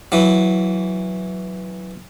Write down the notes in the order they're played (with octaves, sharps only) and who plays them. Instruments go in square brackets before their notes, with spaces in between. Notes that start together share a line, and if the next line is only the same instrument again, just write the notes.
[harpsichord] E3 F#3